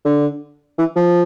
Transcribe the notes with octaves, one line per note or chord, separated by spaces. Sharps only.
D3
E3
F3